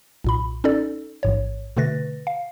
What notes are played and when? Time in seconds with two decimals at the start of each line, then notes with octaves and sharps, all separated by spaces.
0.24 B1 A#2 B5
0.64 C#4 D#4 A4 D5
1.23 A1 G#2 C#5
1.77 B2 D3 A3 B4 A6 A#6
2.27 F5